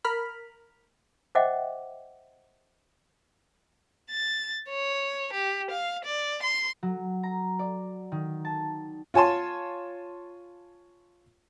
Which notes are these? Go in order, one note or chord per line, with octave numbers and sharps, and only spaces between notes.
A#4 B5 F6
C5 D#5 E5 F#5 G5 D6
A6
C#5
G4
F5
D5
C6
F#3
A#5
D5
D#3
A5
F4 C#5 G#5 A5 C6